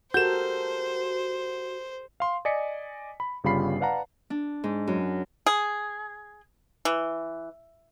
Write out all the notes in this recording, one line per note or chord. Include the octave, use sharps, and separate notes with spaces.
F#4 G4 A4 A#4 C5 G6 E7
F5 C6
D5 D#5 G#5 B6 C#7
B5
G1 C#3 G3 F4 B5 C7
B4 D5 F5 F#5 A5 A#5
D4
G#2
F#2
G#4
E3